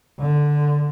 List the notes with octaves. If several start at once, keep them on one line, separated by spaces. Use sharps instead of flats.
D3